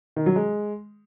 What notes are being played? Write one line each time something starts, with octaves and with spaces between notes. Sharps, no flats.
D#3
F#3
G#3